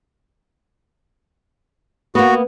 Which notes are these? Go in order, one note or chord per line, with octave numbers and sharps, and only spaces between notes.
A#3 B3 F#4